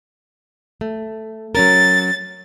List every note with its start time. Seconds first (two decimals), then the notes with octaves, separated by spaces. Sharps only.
0.81 A3
1.55 F#3 C#4 A#4 A6